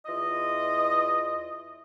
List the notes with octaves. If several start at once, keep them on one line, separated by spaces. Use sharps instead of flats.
E2 E4 F4 D#5